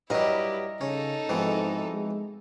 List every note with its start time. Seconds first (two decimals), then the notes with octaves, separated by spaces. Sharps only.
0.10 G2 F#3 E4 G4 A#4 D#5
0.81 C#3 C#4 D#4 A4
1.29 F2 G#2 B2 E3
1.93 G#3